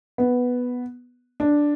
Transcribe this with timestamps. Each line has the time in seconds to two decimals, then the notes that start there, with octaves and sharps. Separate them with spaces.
0.18 B3
1.40 D4